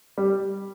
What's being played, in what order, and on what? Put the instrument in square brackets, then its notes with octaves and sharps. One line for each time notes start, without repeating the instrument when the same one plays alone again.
[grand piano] G3